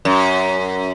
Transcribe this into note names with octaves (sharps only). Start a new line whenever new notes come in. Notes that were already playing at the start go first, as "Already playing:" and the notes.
F#2